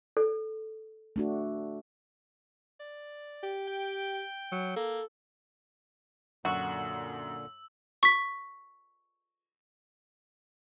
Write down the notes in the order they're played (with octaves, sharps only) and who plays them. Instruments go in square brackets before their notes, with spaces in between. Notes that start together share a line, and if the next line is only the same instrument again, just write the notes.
[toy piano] A4
[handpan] A3 D4 F#4
[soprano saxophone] D5
[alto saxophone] G4
[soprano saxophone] G5
[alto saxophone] F#3
[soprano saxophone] A#3 [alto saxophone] A4
[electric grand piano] F#2 [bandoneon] A#2 D3 [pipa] F#4 [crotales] E6
[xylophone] C#6 B6